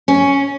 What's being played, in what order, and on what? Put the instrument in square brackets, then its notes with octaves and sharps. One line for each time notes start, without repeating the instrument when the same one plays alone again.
[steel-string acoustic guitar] C#4